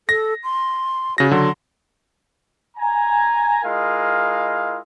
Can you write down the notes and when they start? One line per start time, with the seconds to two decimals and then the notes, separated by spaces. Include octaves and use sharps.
0.09 A4 A#6
0.44 C6
1.18 C#3 F#4 A#6
1.31 D3 F#3 C6
2.77 G#5 A#5
3.63 G#3 E4 F4 A#4 D#5 F5